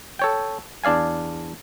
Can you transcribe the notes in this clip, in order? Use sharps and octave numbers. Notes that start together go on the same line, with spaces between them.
A4 C#5 G5
E2 D4 D5 F5 G#5